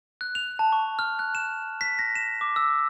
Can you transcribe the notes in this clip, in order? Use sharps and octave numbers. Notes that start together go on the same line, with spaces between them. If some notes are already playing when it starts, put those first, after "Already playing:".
F#6
F7
A5
C#6
F6
F#6
E7
B6
A#6
E7
D6
E6